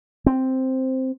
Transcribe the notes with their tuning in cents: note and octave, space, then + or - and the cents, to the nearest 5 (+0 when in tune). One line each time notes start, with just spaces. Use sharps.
C4 +0